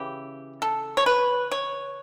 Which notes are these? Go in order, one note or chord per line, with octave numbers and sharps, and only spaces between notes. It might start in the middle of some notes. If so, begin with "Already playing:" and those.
Already playing: C#3 E3 G4
A4
C#5
B4
C#5